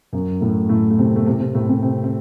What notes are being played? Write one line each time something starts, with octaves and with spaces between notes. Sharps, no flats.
F#2 F#3
A2 A3
A2 A3
A3
C3 C4
A3
C3 C4
C3 C4
A2 A3
C3 C4
C3 C4
C4